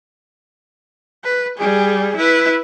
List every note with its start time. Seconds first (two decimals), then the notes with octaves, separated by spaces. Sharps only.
1.24 B4
1.58 G3 G#4
2.17 E4 B4